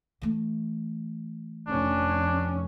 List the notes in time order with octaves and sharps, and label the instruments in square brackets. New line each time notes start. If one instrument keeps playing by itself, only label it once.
[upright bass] E3 A3
[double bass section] F1 C#4 [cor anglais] D4